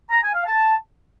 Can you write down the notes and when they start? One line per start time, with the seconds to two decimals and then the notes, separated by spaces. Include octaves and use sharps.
0.11 A#5
0.23 G#5
0.34 F5
0.46 A5